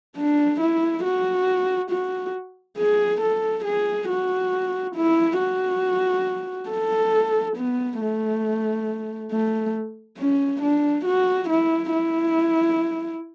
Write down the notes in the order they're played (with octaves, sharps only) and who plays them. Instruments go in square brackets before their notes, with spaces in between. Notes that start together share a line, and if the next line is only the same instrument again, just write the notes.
[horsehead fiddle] D4
E4
F#4
F#4
G#4
A4
G#4
F#4
E4
F#4
A4
B3
A3
A3
C#4
D4
F#4
E4
E4